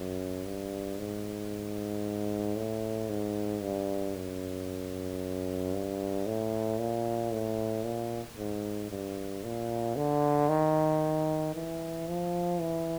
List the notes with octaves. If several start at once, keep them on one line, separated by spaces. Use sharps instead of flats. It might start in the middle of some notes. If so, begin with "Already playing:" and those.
Already playing: F#2
G2
G#2
A2
G#2
G2
F#2
G2
A2
A#2
A2
A#2
G#2
G2
A#2
D3
D#3
E3
F3
E3